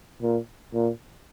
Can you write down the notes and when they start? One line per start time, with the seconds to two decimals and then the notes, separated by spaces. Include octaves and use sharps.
0.21 A#2
0.73 A#2